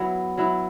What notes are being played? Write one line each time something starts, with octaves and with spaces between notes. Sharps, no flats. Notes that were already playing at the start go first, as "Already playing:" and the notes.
Already playing: F#3 B3 E4
F#3 E4